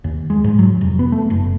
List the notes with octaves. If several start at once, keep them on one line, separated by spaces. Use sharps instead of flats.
D#2
G#3
G#2
F#3
F1
B3
A3
F#1